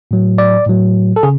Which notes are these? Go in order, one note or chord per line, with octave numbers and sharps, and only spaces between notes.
A2 F#3
D5
A2 F#3
A4
C#3 G#4